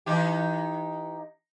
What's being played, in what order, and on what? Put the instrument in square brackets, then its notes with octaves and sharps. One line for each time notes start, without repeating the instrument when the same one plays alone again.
[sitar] E3 D#4 G4